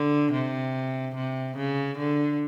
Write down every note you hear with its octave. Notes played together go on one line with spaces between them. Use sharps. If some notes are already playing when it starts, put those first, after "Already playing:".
Already playing: D3
C3
C3
C#3
D3